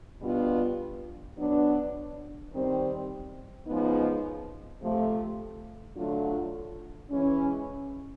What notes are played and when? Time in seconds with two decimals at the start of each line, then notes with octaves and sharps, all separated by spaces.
0.21 B2 G3 B3 D4 F4
1.36 F#3 B3 D4
2.51 D#3 G3 C4
3.66 C#3 F3 G#3 B3 D#4
4.81 C3 F3 A3
5.95 D3 F#3 A3 D4 F4
7.10 E3 G#3 C#4